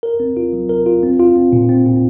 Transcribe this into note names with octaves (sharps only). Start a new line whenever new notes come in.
A#4
C4
F4
F#3
A#4
F4
C4
F4
C4
A#2
C4
A#2